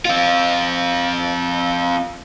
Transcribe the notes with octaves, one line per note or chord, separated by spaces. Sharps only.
C4 F4